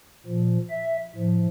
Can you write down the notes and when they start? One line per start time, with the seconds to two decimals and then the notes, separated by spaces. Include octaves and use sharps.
0.26 A#2 F3
0.70 E5
1.15 A2 F3